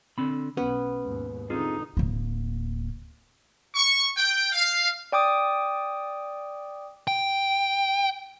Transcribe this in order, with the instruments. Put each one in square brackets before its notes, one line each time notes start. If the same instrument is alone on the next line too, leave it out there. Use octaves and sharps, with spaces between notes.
[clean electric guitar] D3 C4 B5
[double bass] B1 [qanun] B3 [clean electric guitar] C#4
[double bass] D#2 G#2
[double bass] D3 D#4 [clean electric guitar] C4 F4 G#4
[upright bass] D1 A#3
[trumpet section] C#6
G5
F5
[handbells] D5 G5 D6 D#6
[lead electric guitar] G5